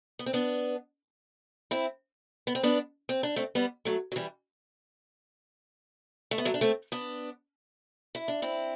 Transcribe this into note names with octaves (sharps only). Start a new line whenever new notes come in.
B3
C4
B3 D4
C4 E4
B3
C4
B3 D4
C4
D4
A3 C4
G3 B3
F#3 A3
F#3
E3 G3
A3
B3
F#3 A3
D4
A3 C4
B3 D4
E4
D4
C4 E4